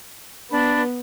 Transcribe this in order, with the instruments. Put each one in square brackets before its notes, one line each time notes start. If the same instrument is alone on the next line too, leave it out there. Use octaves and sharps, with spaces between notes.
[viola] B3 [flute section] D4 B5